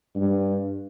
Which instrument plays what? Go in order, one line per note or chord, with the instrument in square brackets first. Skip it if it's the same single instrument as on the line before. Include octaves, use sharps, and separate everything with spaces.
[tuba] G2